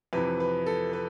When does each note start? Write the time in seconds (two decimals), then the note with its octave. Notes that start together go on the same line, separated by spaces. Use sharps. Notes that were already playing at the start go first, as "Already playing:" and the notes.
0.13 F2 C3 E3 B4
0.40 B4
0.67 A4
0.93 B4